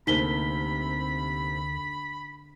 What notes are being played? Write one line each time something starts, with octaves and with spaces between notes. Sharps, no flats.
D2 C3 A#3 C4 D#4 B5 B6 G7